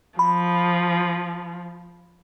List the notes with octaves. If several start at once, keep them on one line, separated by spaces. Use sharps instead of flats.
F3 B5